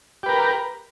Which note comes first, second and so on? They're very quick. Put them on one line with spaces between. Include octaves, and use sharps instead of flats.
G4 B4 A#4